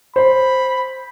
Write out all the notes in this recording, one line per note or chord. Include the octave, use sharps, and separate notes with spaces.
C5 B5